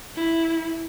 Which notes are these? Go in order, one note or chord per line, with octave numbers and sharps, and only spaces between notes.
E4